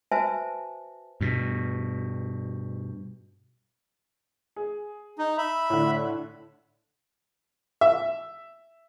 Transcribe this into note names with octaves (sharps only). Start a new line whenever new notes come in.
F#4 B4 C5 E5 G#5 A5
G2 B2
G#4
D#4
E5 B5
A2 D3
E5